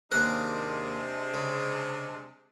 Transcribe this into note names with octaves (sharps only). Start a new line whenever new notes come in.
D#2 C3 G#3 D4 A#4 F#6
C#3